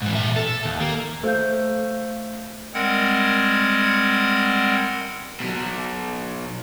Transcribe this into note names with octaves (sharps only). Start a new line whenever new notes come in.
G#2 E3
A#2 E5
A4
D#2
A#3
A3 C5 F5 G6
G3 G#3 C4 A#4 F#5 G#6
B2 F#3